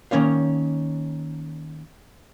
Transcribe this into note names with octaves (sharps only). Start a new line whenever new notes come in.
D#3 A#3 C#4 C#5 F5